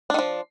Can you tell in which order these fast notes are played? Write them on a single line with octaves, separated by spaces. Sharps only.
D4 D#3 F3